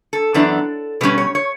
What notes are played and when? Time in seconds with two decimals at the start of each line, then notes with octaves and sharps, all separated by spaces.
0.13 A4
0.34 F#2 E3 B3 D4
1.01 B2 G3 C#4 B4
1.18 C#5
1.35 C#5